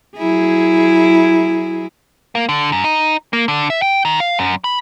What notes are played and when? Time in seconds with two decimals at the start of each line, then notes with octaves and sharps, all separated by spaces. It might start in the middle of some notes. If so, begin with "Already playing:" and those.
0.17 F#3 E4 G#4
2.35 A#3
2.49 D3
2.72 F#2
2.84 D#4
3.33 A#3
3.48 D3
3.70 E5
3.82 G5
4.05 D#3
4.20 F5
4.39 F#2
4.64 B5